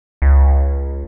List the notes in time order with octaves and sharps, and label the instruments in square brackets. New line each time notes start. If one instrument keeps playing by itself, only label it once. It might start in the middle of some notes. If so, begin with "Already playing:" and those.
[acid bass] C#2